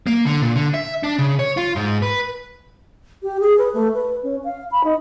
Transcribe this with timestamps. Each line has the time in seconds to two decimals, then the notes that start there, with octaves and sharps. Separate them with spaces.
0.07 A#3
0.26 D3
0.42 A#2
0.56 D3
0.74 E5
1.03 D4
1.18 C#3
1.39 C#5
1.57 F4
1.76 G#2
2.02 B4
3.23 G4
3.40 G#4
3.58 B4
3.74 A3
3.94 B4
4.23 C#4
4.44 F5
4.71 B5
4.84 D#4